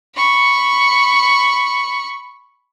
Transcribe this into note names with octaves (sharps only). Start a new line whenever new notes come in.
B5 C#6